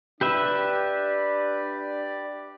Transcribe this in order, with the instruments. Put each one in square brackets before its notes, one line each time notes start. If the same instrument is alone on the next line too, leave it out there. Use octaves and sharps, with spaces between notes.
[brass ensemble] D4 D5 [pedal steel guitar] G4 B4 E5